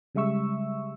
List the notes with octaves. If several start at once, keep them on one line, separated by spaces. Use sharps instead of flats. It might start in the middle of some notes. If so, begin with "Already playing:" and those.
C#3 G3 G#3 E5 C#6 E6